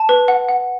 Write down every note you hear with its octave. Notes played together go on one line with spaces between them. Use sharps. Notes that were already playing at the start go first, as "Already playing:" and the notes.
Already playing: A5
B4
F#5
F#5